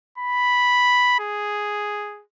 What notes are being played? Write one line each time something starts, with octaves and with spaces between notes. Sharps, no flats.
B5
G#4